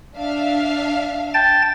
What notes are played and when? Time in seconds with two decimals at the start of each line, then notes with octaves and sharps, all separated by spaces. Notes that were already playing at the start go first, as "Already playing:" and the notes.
0.17 D4 E5 F5
1.34 G5 A5 A6